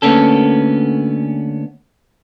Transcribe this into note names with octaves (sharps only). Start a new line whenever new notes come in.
D2 A#3 B3 C#4 A4